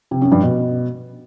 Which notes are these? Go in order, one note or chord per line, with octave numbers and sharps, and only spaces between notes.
C3
F#2
G2
B2